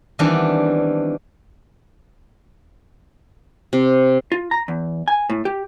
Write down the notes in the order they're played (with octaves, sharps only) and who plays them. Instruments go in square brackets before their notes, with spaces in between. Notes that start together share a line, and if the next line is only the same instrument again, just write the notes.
[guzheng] D#3 E3 G3 B3 C4 D4
[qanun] C3
[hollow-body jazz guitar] F4
A#5
E2
G#5
A2
G4